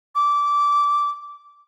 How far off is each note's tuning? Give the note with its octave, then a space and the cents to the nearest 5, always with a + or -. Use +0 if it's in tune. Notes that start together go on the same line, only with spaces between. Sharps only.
D6 -15